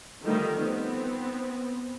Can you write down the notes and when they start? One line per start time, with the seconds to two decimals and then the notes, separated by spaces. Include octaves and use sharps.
0.23 D3 D#3 F3 G3 A3 D#4
0.59 B3 C4